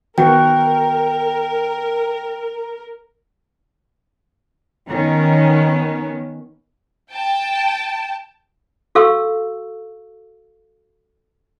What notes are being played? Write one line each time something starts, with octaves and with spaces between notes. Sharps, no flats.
D#3 B3 F#4 A#4 G5
D#3 B3 C#4
G5 A5
F#4 A4 F5 C#6 E6